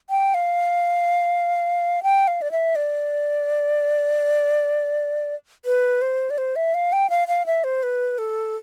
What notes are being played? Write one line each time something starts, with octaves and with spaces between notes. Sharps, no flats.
G5
F5
G5
F5
D5
E5
D5
B4
C5
D5
C5
E5
F5
G5
F5
F5
E5
C5
B4
A4